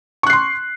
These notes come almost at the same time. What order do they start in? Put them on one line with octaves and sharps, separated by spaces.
C#6 F#6 C7 C6